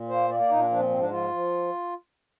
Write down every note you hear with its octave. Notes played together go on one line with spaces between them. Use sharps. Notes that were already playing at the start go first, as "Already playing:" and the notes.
Already playing: A#2
A#3 C5
A#3 D5
D5
A#2 D#4
D4
F3 D4
C4
G#2 C4
D4
F3 F4
F3